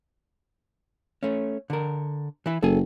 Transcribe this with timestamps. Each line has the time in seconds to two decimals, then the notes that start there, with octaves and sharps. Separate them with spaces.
1.23 A3 C#4
1.70 D3 A#4
2.46 E3 E4
2.63 F#1 A4 G#5